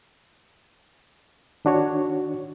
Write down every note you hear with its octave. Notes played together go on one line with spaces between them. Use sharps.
D#3 D4 F#4 C#5